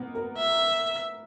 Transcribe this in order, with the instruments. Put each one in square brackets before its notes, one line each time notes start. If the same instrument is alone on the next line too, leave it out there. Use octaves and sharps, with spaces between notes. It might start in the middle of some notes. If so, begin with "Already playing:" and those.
Already playing: [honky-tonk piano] A#3 B3
A#4
[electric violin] E5